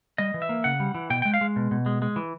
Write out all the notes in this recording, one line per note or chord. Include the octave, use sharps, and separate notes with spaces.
G3 D#5
E3
E5
A#3
C#3 F#5
G3
E3
B2 G5
G#3 G5
F5
G#3
B2
B2
G#3
G#3
E3